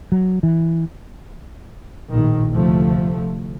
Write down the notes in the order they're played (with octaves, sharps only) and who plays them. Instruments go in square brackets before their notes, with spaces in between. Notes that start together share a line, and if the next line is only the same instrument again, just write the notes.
[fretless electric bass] F#3
E3
[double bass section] A#1 A2 D#3
D2 C3 F3 A3